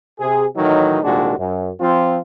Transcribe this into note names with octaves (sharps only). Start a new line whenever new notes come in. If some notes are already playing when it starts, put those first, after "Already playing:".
C3 G#4
A2 D#3 E3 F#3 D#4
C2 A#2 D#3 G#3 D4 F#4
F#2
F3 C4 F4